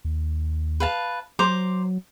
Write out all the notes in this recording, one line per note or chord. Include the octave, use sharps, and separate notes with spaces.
D#2
B4 F5 A5
F#3 C5 A#5 D6